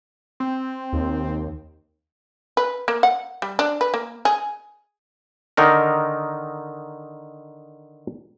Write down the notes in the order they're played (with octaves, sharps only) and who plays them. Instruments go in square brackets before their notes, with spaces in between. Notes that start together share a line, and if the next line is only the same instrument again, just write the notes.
[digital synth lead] C4
[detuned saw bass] D#2
[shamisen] B4
A#3
F#5
G3
D4
B4
A#3
G#4
[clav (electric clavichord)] D3 D#3 D#4 A#4